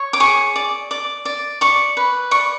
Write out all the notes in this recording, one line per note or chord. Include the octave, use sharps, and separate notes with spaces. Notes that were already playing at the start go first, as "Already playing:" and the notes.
Already playing: C#5
D6
G#4 C#6
D5
D5
D5
D5 C#6
B4
D5 C#6